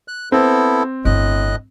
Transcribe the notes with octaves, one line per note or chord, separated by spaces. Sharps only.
F#6
B3 C4 E4 A4
G1 A2 E4 D#5 F#6